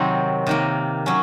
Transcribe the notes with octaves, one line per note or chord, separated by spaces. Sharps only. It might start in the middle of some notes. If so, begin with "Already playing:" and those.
Already playing: C3 D#3 F#3 C4
C3 D#3 A#3
F#3 C#4